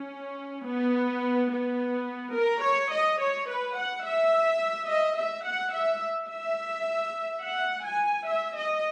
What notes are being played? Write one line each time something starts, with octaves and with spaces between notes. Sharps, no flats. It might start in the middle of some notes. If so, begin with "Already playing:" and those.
Already playing: C#4
B3
B3
A#4
C#5
D#5
C#5
B4
F#5
E5
D#5
E5
F#5
E5
E5
F#5
G#5
E5
D#5